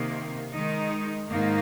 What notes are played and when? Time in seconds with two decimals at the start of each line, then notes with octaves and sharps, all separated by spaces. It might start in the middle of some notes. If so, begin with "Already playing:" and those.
Already playing: C3 D#3 A#3
0.51 D#3 G#3 D#4
1.28 G#2 D#3 A#3 D#4